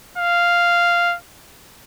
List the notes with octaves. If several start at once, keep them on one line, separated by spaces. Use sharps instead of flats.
F5